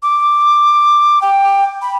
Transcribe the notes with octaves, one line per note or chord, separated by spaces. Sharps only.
D6
G5
B5